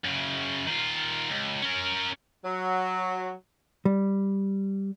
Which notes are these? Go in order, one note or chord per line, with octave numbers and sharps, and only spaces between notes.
F#2 C#3
D#3 F4
C#2
C#4 A#4
F#3
G3